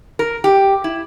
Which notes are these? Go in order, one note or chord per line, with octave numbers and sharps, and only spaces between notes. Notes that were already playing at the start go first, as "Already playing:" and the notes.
A#4
G4
E4